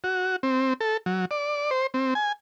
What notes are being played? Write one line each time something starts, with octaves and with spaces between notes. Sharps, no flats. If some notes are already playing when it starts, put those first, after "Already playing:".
F#4
C4
A4
F#3
D5
C5
C4
G#5